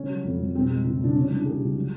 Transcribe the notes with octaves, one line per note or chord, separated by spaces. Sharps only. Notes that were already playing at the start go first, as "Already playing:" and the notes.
Already playing: C#3 C#4
F#3
F2
F2
B2 C4
G#3
C#2
C#2 D4
C3 C#4
E3 D4
G3 G#4
C#2
F#3